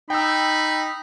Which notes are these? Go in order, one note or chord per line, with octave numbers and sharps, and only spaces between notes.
D#4 G5 B5 E6